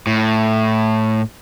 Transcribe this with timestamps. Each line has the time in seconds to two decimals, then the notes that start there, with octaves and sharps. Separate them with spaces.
0.07 A2